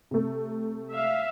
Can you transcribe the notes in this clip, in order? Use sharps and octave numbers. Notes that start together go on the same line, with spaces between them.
C3 A3
E5 F5